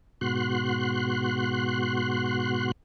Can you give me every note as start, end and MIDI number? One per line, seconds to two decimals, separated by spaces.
0.21 2.72 44
0.21 2.72 47
0.21 2.72 66
0.21 2.72 84
0.21 2.72 90